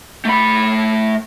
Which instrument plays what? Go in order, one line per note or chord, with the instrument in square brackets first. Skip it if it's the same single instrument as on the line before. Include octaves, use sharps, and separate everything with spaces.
[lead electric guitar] A3 B5